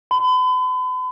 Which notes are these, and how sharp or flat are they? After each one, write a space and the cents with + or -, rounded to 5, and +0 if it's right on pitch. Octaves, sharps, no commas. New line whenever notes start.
B5 +40